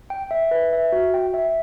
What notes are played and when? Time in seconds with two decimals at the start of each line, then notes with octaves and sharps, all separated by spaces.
0.10 G5
0.31 E5
0.51 B4
0.73 E5
0.92 F#4
1.14 G5
1.34 E5